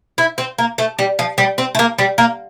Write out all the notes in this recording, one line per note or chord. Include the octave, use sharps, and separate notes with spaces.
E4
C4
A#3
A3
G3
F3
G3
C4
A3
A#3
G3
A#3